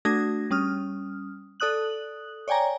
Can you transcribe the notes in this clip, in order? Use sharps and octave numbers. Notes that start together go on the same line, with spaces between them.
A3 D4 F#4 D#6 G#6 A#6
G3 C#4 D#6 F6
A4 D5 D#6 F#6 F#7
C#5 D5 G5 G#5 A#5